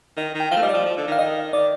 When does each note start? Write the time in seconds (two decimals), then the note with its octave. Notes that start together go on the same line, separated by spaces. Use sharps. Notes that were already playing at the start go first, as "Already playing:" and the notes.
0.17 D#3 D#5
0.35 D#3
0.40 G5
0.51 F3 F5
0.57 A3
0.62 G3 D#5
0.69 F3 D5
0.86 F3
0.97 D3
1.08 D#3
1.12 F5
1.19 D#3 D#5
1.53 D#3 D5